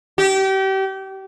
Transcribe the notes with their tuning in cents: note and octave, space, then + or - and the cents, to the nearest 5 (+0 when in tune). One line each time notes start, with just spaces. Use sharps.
G4 -30